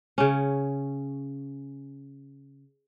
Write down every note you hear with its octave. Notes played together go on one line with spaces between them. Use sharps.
C#3 C#4